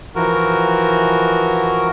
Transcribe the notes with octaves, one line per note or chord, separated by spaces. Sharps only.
E3 F3 F#4 A#4